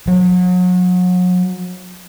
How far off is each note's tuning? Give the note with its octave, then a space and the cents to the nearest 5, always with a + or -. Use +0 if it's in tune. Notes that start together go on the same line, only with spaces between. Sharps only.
F#3 -35